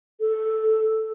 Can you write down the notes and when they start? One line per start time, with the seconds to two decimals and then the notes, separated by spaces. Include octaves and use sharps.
0.20 A4